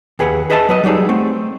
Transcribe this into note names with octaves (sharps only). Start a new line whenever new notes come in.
D#2 G#4 B4 F#5
G#4 B4 D#5 E5 G5 A5
F#3 B4 D#5
F#3 G3 D#4 G#4 A4
A3 C4